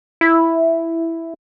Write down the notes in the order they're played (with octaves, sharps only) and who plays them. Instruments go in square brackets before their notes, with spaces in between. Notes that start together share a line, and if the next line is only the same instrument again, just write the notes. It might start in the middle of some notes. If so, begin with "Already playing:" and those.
[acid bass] E4